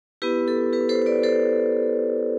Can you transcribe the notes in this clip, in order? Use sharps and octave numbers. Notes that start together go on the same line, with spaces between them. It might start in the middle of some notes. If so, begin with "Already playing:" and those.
B3 E4 G4 B4
A4
G4 B4
A4 C5
C5
B4 D5
A4 C5